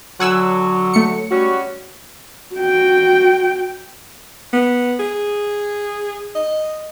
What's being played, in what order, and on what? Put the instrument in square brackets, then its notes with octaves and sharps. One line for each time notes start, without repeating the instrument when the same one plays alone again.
[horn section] D3 F#3 [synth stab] F#5 G#5 E6
[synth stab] A3 C#7
[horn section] G3 C#4 F#4
[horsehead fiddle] F#4 G5
[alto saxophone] B3
G#4
D#5